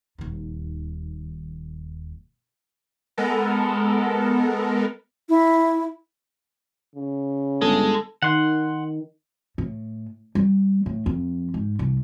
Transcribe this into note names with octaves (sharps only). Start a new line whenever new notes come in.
D#1 D#2
G#3 B3 A4 A#4
E4
C#3
G1 G#3 A4 A5
D#3 F#5 C6
A2
G3
A2
F2
G#2
C2